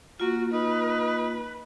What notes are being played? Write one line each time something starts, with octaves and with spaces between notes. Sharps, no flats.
A#3 F4 F#4
D#4 B4